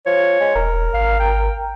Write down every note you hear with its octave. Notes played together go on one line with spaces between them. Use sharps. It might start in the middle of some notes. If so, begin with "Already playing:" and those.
F3 C#5
G#3
E1 A#4
G#1 F5
G5